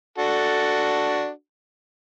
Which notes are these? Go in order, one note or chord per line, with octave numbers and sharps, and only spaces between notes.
D4 F#4 A4